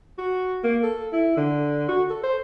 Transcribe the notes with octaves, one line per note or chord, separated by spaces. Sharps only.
F#4
A#3
A4
E4
D3
F#4
A4
C5